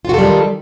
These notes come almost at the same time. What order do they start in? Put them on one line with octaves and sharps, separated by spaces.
F4 F#4 A4 G3 D#3